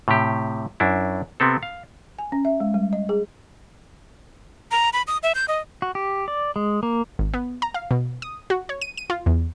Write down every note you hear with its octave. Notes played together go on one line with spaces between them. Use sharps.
A2 C3 G4
F#2 D4 E4
C3 B3 C4 A4
F5
G#5
C#4
E5
G#3
G3
D#5
G#4
A#5
B5
D#6
E5
G6
D#5
F#4
G4
D5
G#3
A#3
G#1
B3
A#5
F5
B2
D#6
F#4
C#5
D#7
D#7
F4
E2